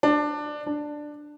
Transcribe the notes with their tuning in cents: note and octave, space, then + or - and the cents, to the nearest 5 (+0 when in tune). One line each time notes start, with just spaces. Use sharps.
D4 +15
D4 +10